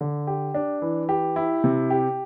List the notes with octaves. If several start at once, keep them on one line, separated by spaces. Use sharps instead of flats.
D3
G4
D4
E3
G4
E4
C3
G4